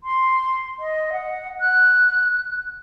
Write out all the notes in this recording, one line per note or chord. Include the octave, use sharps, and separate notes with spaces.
C6
D#5
F#5
F#6